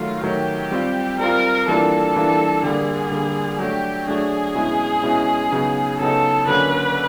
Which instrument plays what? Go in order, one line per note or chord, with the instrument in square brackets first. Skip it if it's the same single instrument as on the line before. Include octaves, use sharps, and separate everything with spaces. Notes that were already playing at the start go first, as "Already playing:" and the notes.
Already playing: [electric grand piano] D#3 F#3 A3 [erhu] F4
[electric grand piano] D#3 F#3 A3 [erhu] G4
[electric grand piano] G3 C4 F4
[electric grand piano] G3 C4 F4 [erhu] A#4
[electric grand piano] E3 G3 A#3 D4 F4 [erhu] A4
[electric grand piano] E3 G3 A#3 D4 F4
[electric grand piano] D3 G3 A#3 [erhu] G#4
[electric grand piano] D3 G3 A#3
[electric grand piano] F#3 A3 D4 [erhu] G4
[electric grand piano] F#3 A3 D4 [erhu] G#4
[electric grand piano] B2 G#3 C#4 E4
B2 G#3 C#4 E4
C#3 F#3 B3 D#4
[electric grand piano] C#3 F#3 B3 D#4 [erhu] A4
[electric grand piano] D3 F#3 A#3 C#4 [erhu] B4